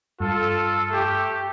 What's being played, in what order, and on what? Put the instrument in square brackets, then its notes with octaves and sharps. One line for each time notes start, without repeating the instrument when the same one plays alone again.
[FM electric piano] G2 [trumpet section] F4 A4
[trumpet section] A3 G4